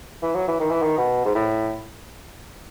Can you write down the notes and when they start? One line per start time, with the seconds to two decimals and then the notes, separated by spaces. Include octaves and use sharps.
0.23 E3
0.35 F#3
0.48 E3
0.60 D#3
0.71 E3
0.82 D#3
0.98 B2
1.25 G#2
1.35 A2